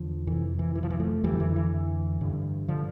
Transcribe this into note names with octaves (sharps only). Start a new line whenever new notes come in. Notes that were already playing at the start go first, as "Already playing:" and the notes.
Already playing: E2 D3 F3
F2 C3 E3
E3
E3
F3
E3
F3 A3
F2 D3 E3 G3
E3
E3
G2 D3
D3 F3